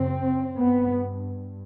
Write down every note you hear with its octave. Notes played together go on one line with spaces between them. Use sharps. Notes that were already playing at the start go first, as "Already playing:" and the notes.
Already playing: F#2 C#3 C4
G2 B3